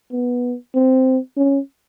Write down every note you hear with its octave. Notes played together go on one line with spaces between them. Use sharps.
B3
C4
C#4